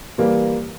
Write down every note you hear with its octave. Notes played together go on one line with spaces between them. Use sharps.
E3 G3 A#3